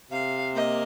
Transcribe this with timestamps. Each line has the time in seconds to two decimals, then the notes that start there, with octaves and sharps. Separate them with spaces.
0.10 C3 F5
0.53 A#3 D#5